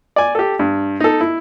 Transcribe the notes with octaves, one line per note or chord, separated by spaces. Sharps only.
D5 G#5
G4 A4
G2
D#4 A4
E4